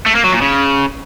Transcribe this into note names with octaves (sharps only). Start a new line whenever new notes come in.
A3
A#3
F#3
A#2
C#3